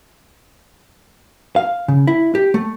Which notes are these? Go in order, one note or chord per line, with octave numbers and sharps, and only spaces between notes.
F5
C#3
E4
G4
A3